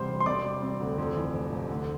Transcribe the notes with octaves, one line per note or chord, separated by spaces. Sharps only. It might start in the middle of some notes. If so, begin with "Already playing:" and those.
Already playing: E2 C3 G3 C5 C6
E1
C6
C3 D5 D6
G3
C4
D2
F2
E3
F1
F1
D2